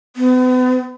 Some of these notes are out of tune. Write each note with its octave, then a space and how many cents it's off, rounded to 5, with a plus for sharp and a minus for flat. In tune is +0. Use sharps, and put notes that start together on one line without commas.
B3 +40